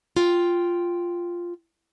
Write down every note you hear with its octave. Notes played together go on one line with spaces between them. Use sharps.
F4 G5